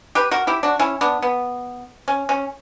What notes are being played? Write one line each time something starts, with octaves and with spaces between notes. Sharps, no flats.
G4 B4
F#4 A#4
E4 G4
D4 F#4
C#4 E4
B3 D4
B3
C#4
C#4